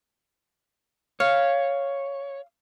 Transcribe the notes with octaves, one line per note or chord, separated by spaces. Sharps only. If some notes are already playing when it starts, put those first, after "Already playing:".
C#5 F5